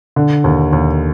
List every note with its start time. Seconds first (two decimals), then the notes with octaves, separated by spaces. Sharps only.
0.16 D3
0.44 D#2
0.73 D#2